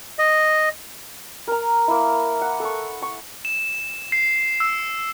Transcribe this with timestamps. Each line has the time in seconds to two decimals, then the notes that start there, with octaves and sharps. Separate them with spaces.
0.19 D#5
1.48 A#4 A#5
1.88 A#3 E4
2.41 F#5
2.60 A4 C#6
3.02 C#6
3.45 E7
4.12 C7
4.60 E6